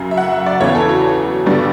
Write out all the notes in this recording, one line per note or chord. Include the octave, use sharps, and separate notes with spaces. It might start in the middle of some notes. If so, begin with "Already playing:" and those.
Already playing: F#2 C#3 F#3
E5
F#5
E5
D5
E2 C#3 E3 B3 C#5
A4
F#4
G2 D3 G3 B3 D5